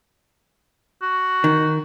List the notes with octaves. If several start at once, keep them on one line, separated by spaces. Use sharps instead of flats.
F#4
D#3